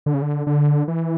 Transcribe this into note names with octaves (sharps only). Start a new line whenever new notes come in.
D3
C#3
D3
D3
E3